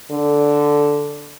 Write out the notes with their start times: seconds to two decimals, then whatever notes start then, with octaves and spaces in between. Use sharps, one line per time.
0.11 D3